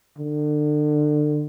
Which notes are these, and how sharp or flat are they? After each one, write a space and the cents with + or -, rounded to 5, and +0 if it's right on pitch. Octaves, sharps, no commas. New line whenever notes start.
D3 +30